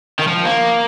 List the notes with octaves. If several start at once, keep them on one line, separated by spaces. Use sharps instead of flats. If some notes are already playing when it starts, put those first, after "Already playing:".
D#3
F3
A#3